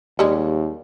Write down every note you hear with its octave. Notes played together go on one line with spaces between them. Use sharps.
D#2 G3 G#3